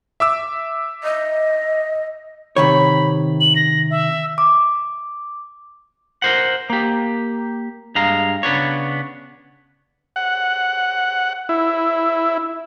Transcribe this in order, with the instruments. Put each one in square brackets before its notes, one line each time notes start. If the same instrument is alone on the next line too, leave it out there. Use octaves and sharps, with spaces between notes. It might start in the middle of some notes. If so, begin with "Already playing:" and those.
[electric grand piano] E5 D6 E6
[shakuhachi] D#5
[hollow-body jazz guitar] C3 D#3 C#5 [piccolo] B5
[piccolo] F#7
A#6
E5
[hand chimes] D6
[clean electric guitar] A#4 C5 F#5
A#3 G4
G2 G#3 F5 A#5
C#3 B3 D4 C#5
[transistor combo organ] F#5
E4